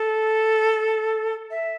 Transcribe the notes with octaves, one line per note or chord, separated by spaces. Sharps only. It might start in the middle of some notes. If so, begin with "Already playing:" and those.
Already playing: A4
E5